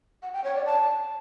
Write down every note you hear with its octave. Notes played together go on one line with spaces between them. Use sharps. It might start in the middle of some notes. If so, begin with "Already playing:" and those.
F#5
G5
C#5
D5
A5